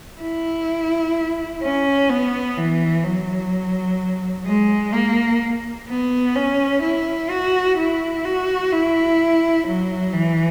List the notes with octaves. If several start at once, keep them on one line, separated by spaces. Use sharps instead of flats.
E4
C#4
B3
E3
F#3
G#3
A#3
B3
C#4
E4
F#4
E4
F#4
E4
F#3
E3